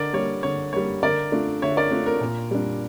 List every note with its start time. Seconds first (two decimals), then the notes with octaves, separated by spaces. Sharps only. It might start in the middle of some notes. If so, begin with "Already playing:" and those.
Already playing: D3 A#4 D5
0.13 G3 A#3 C#5
0.43 D3 C#5
0.73 G3 A#3 C#5
1.03 D3 A#4 D5
1.32 A3 D4 F4
1.62 D3 C#5 E5
1.77 A#4 D5
1.91 A3 D4 F4
2.06 A#4
2.21 A#2
2.51 G3 D4